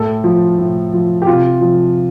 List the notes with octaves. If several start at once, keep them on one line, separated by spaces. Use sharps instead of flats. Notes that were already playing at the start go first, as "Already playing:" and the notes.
Already playing: A2 A4
F3
A2
F3
G4
C3 F4
F3